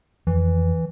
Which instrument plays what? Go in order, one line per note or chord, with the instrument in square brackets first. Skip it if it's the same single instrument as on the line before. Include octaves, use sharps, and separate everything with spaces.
[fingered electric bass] F2 [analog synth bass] E3